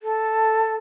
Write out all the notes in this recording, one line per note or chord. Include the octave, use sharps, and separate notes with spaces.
A4